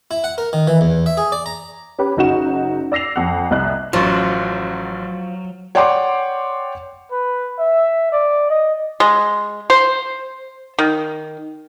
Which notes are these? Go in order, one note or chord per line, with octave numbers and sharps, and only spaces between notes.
E4
F#5
A#4
D#3
E3
E2
E5
G#4
D5
A#5
C#4 G4 B4
F#1 D#4 F#4 E7
D5 E6 A#6 C7 F7
F2 F#5
C2 D#5 F#6
A1 F#2 F3 F#3 F4 C#6
C#5 D5 F#5 G5 C6 D6
B4
E5
D5
D#5
G#3
C5
D#3